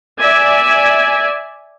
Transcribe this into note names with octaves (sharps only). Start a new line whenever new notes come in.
D5 E5 G#5